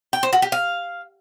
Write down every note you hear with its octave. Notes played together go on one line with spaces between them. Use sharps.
G5
C5
F#4
G4
F5